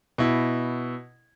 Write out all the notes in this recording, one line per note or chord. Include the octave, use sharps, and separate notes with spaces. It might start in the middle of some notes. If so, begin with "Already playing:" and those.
B2 E4